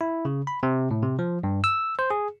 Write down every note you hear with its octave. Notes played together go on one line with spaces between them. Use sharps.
E4
C#3
B5
C3
A2
C3
F3
G2
E6
C5
G#4